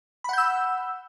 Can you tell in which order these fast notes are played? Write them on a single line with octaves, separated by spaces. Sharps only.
B5 F#5 G6 E6